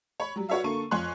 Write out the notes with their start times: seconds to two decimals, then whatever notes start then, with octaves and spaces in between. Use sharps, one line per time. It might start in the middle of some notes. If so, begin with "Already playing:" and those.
0.20 C#5 B5
0.36 F#3 G3
0.49 F#4 B4 C#5 D5 E5 F5
0.64 D3 A#3 A4 C#6 D#7
0.91 F2 F4 C#5 G#5 C6 F#6